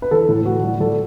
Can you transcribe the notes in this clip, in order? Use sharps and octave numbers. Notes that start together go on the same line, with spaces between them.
B4
E3 A4
A2
A2 F#4
G3
G3 A4